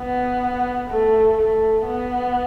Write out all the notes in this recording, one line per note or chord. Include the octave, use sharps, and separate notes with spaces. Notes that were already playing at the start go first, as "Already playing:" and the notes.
Already playing: B3
A3
A3
B3